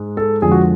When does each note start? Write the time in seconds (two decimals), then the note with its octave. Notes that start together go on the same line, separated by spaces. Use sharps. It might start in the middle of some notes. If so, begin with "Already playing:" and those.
Already playing: G#2 G#3
0.17 A4
0.42 F2 D3 F3 G#3 G#4
0.52 F#4